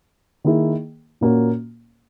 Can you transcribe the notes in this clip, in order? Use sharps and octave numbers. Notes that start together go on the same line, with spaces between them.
D#3 A#3 E4 G#4
A#2 A#3 C#4 F#4